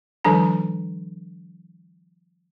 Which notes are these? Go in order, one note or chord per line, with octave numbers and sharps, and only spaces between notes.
D#3 F3 G3 D4 A#5